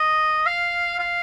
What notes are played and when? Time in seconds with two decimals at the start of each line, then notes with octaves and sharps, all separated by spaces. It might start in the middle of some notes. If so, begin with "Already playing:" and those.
Already playing: D#5
0.46 F5
0.99 F5